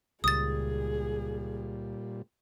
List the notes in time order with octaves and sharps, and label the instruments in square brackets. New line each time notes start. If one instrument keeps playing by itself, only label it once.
[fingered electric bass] C#2 [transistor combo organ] A#2 G3 [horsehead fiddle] G#4 [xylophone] D#6 A6